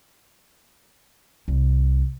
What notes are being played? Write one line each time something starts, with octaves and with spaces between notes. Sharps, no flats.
C2